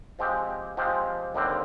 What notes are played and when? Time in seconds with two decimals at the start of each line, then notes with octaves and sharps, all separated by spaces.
0.19 F3 G#3 C4 G4
0.77 F3 G#3 C4 G4
1.35 D#2 D3 G3 C4